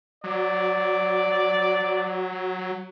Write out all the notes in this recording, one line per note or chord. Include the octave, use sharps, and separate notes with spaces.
F#3 D5